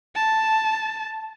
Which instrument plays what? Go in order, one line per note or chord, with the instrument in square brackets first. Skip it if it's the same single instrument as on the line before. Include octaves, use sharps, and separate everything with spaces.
[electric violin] A5